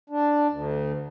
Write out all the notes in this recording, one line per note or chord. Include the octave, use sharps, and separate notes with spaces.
D4
D2